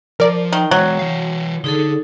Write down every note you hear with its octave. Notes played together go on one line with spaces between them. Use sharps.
F3 A#4 D5
D#3 G5
E3 F#3 G#3
E3 F5
D3 D#4 G#4 A4